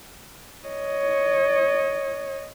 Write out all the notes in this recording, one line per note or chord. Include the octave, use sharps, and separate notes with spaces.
C#5 D#5